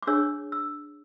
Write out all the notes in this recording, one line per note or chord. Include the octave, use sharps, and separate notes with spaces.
D6
D4 G#4 C#5 E6
E6